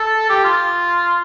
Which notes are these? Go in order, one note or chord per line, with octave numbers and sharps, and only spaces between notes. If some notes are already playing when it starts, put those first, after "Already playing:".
Already playing: A4
G4
F4